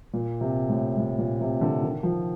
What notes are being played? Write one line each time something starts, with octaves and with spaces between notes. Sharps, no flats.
A#2
C3
A2
A2
A#2
C3
D3
D#3
F3